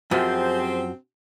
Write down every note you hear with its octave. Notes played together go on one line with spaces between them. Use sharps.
F#2 F3 C4 G4 G#4 C5